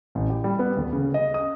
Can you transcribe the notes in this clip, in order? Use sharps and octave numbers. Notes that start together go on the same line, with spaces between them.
A1
G4
G3
B3
D2
C#3
D#5
D#6